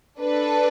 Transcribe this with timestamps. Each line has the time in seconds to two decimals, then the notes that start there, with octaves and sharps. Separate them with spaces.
0.19 D4 A4 B4